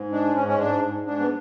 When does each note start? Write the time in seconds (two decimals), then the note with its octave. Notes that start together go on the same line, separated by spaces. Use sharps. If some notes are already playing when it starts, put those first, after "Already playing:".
Already playing: G#2
0.12 G#3 D4
0.35 G#2 C#4
0.48 C#4
0.59 G#2 D4
0.82 G#2
1.06 G#2 D4
1.20 B3